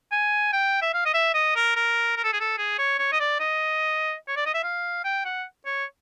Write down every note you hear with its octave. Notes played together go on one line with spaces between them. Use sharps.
G#5
G5
E5
F5
D#5
E5
D#5
A#4
A#4
A#4
A4
G#4
A4
G#4
C#5
C#5
D#5
D5
D#5
C#5
D5
D#5
E5
F5
G5
F#5
C#5